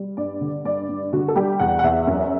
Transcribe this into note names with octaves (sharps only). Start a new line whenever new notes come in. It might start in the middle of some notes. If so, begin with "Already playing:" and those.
Already playing: G3
G2 D5
D3
G2 D5
G2
D3 F#4
A4
G3 G4
E2 F#5
F#5
E2 E5
F#2